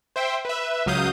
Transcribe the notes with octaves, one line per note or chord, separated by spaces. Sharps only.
C5 E5 G5
B4 E5
C#2 F#3 F5 D#6 G6